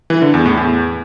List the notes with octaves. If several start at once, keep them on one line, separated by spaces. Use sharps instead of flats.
E3
D3
E2
A2
E2